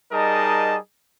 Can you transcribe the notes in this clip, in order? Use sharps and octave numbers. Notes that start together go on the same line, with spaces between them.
G3 D#4 G#4 A#4 D#5 A5